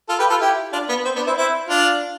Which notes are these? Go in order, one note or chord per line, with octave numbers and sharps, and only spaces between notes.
F4 A4
G4 B4
F4 A4
E4 G4
D4 F4
B3
C4
B3 D4
C4 E4
C4 E4
D4 F4